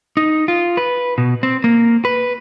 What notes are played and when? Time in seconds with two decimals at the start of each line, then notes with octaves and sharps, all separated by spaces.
0.17 D#4
0.48 F4
0.77 B4
1.18 B2
1.43 C4
1.64 A#3
2.05 B4